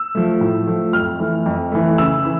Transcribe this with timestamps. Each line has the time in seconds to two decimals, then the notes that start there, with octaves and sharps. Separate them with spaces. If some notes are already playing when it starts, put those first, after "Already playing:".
Already playing: E6
0.15 F3 A3
0.41 A2
0.67 F3 A3
0.93 F2 F6
1.20 E3 A3
1.46 F2
1.72 E3 A3
1.98 C#3 E6
2.25 E3